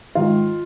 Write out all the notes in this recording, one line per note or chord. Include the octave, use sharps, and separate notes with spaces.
G#2 D#3 F4